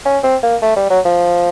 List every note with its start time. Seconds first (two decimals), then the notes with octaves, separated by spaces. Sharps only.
0.05 C#4
0.23 C4
0.43 A#3
0.62 A3
0.76 G3
0.90 F#3
1.05 F3